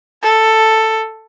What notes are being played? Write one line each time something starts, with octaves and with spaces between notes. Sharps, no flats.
A4